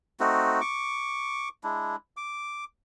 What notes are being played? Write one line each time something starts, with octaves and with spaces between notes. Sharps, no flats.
A3 C4 D#4 F#4
C#6 D6
G#3 D4 E4
D6